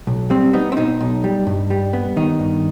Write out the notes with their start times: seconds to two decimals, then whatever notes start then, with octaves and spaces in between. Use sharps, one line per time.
0.07 B1
0.30 G3 C4
0.53 B3 D#4
0.72 C4
0.77 B2 D#4
1.01 B1
1.24 G3
1.47 G2
1.70 G3
1.93 B3
2.17 D#3 D#4
2.39 G2